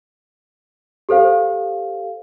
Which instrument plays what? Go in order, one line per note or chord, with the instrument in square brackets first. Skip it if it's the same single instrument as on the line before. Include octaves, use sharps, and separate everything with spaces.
[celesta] G4 A4 C5 F5